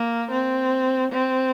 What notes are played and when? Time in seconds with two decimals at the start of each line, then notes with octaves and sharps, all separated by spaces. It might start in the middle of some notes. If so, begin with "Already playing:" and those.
Already playing: A#3
0.31 C4
1.12 C4